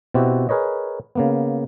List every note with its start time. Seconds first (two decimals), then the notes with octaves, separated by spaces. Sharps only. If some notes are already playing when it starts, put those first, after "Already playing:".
0.14 B2 C4 E4 F#4 G4
0.49 G#4 A#4 B4 C#5 D#5
1.15 C#3 A#3 B3